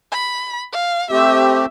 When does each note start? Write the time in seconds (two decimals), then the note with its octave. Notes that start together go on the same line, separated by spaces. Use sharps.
0.11 B5
0.73 F5
1.11 A3 C4 G4 E5